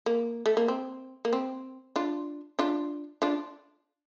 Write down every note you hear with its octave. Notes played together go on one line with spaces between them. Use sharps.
A#3
A3
A#3
C4
A#3
C4
D4 F4
D4 F4
D4 F4